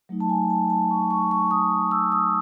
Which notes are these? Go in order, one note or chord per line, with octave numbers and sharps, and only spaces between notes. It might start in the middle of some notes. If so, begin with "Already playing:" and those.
F#3 A3 D#4
A5
G#5
A5
A5
C#6
C#6
C#6
D#6
E6
D#6